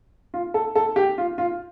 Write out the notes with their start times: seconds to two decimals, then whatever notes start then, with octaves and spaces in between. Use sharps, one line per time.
0.34 F4
0.54 A4
0.76 A4
0.96 G4
1.18 F4
1.38 F4